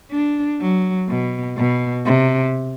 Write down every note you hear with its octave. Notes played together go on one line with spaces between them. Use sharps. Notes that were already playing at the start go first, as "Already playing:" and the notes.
D4
F#3
B2
B2
C3